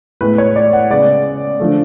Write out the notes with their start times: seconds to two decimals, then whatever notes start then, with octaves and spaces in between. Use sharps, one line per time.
0.21 A2 G#3 B3 B4
0.38 C#5
0.56 D5
0.73 F#5
0.90 C#3 G#3 B3 D5
1.60 D3 F3 A3